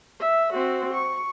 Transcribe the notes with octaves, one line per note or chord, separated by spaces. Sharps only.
E5
C4 F#4
C#6